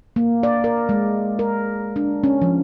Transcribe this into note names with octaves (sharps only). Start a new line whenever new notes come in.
A#3
D5
A#4
G#3
A#4
D4
C#4
F3